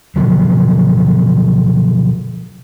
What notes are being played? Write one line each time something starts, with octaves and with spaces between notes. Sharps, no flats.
B2 D3 F3 F#3